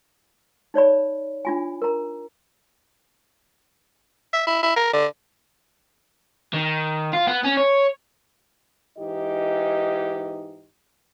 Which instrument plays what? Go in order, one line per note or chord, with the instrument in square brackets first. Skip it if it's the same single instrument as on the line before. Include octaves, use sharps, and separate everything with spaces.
[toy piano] D#4 C#5 D5 B5
D4 F4 G#5
A#4 A#5
[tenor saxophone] E5
E4
E4
A#4
D3
[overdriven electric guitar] D#3
F4
B3
C#4
C#5
[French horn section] G#2 E3 D#4 G4 D#5